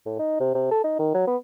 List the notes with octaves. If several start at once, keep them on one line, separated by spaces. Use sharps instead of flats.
A2
D#4
C3
C3
A4
D#4
D#3
F#3
B3